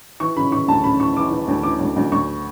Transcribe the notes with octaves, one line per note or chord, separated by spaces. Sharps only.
E3 C#6
C#3 B5
E3 C#6
D2 A5
C#3 B5
E3 C#6
E3 D6
E3
D2
E3 D6
D2
D2
D2 C#6